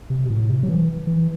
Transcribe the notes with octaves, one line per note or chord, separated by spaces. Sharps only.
C3
B2
A2
C3
F#3
E3
E3